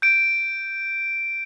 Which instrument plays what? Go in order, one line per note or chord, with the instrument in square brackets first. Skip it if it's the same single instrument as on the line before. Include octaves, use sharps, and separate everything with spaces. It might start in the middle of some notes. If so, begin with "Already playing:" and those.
[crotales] G6 D7